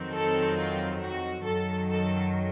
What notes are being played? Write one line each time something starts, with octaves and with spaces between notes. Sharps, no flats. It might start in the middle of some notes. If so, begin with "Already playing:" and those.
Already playing: F2 D#3 F#3 C4
A4
F4
F#4
F#2 D#3 F#3 A4
A4